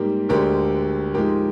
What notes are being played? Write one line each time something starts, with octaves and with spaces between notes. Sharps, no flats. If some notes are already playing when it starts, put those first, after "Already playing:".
Already playing: G#2 G3 A#3 G4 A#4
D2 D3 G#3 G4 A#4
G#2 F3 G#3 G4 A#4